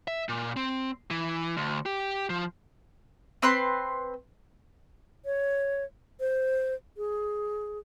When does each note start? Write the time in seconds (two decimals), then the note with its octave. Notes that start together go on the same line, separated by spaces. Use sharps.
0.08 E5
0.29 A#2
0.57 C4
1.10 E3
1.57 D2
1.86 G4
2.30 F3
3.42 C4 B4 C6
5.25 C#5
6.20 C5
6.97 G#4